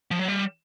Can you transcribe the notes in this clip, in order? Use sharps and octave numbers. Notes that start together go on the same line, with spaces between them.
F3
F#3
G3